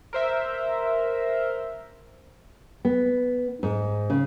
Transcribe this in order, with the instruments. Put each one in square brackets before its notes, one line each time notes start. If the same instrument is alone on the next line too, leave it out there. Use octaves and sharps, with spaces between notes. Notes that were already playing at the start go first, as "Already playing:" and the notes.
[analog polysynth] A#4 C5 E5
[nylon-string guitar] B3
G#2
C#3